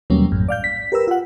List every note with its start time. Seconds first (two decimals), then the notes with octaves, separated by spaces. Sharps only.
0.10 D#2 B2 F#3 G3 A#3 C#4
0.32 A#1 F#2 A2
0.49 D5 F5 G6
0.64 B6
0.92 G4 A#4 B4 E6
1.07 F4 F#5